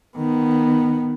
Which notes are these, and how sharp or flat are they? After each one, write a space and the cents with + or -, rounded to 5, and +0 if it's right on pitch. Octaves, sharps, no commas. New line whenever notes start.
D#3 -10 B3 -5